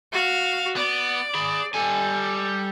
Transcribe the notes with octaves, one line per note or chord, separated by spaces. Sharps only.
F#4 F5
B3 D5
G#4 B5
G3 A4 G#5